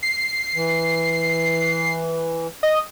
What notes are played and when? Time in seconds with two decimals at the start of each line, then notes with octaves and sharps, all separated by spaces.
0.03 C7
0.55 E3
2.63 D#5